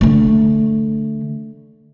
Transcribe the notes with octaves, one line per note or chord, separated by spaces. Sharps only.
D3 A3